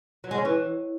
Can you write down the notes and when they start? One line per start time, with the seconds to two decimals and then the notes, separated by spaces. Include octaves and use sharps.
0.24 F#3
0.31 G#3
0.38 C#4
0.45 E3